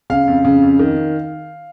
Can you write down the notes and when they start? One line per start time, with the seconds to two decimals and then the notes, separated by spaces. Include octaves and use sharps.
0.10 C#3 F5
0.27 F2
0.45 C#3
0.62 F2
0.79 D#3